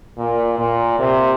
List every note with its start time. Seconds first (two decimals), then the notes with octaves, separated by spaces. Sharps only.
0.18 A#2
0.58 A#2
0.99 C3